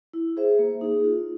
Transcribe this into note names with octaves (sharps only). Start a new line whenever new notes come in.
E4
G#4 C5 E5
A#3
D#4 G#4
F4